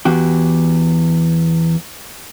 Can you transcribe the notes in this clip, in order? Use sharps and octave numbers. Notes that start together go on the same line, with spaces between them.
E2 F#4 G4